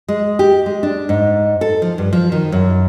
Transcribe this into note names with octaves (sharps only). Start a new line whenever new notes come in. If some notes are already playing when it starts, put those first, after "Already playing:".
G#3
G4
G#3
D4
G#2
A4
F3
G2
F3
D#3
F#2